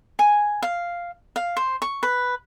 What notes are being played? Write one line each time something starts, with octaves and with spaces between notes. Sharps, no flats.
G#5
F5
F5
C5
C#6
B4